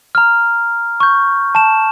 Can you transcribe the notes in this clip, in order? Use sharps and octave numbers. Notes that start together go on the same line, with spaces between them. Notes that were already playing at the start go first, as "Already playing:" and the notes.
A#5 F6
C#6 G6
A5 E7